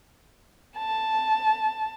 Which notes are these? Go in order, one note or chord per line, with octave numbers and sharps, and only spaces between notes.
A5